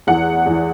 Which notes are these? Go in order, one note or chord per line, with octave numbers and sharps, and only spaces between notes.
E2 E3 F#5
E2 E3